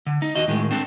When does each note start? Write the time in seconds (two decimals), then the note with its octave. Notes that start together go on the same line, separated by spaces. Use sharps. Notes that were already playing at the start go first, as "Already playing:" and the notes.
0.06 D3
0.22 D#4
0.35 D#2 F#4 D#5
0.48 A2 D#3 G#3
0.71 C4 D4 A4